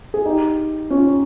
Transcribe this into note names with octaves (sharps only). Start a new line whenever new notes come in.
G#4
D#4 G4
C#4 F4